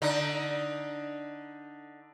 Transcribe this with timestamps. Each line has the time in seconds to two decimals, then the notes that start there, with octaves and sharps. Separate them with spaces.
0.02 D3 D#4